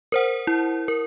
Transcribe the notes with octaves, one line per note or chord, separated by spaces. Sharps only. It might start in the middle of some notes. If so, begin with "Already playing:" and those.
A#4 C5 F#5
E4
A#4